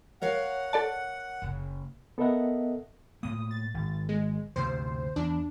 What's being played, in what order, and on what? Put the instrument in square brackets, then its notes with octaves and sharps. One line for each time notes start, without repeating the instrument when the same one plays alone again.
[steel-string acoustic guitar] A#4 C#5 F5 [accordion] F#5
[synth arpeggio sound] A4 D5 A5
[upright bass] F#1 C#3
[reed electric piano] B3 A4 A#4 D#5 E5 F#5
[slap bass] A2 A#3 [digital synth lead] D#6
[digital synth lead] A6
[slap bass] G#1
[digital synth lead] G#3
[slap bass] D2 G2 C3 [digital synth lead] C5
[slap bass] E2 [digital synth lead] D4